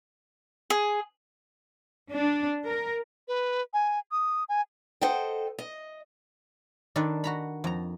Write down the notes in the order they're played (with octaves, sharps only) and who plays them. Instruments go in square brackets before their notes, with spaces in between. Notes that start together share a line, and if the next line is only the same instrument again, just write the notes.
[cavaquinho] G#4
[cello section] D4
A#4
[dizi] B4
G#5
D#6
G#5
[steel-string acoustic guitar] A4 C5 D#5 F#5 G5
D#5
[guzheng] D#3 D4 A4 B4 D5
F#4 A#5 B5
F2 A#5